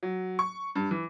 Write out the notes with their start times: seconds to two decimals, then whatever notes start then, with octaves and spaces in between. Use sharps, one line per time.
0.03 F#3
0.39 C#6
0.75 G2
0.91 E3